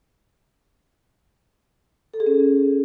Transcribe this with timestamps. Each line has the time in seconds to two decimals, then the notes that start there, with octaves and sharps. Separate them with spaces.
2.14 A4
2.20 G#4
2.27 C#4